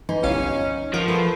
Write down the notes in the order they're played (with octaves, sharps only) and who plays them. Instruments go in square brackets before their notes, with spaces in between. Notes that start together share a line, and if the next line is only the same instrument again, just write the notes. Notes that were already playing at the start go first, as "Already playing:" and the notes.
[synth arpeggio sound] E3 [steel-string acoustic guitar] D#4
[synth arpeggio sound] G1 C2 F5 [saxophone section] C#4
[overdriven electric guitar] F3 [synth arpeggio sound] A#4 [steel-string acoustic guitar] F#5
[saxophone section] A3 G#4 A4 [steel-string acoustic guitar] B4